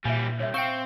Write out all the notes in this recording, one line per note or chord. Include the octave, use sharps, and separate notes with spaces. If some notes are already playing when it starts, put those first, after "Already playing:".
A#2 E3 G3 E5 G#5
C2 C#5 E5
C4 F5 G5 C#6 C#7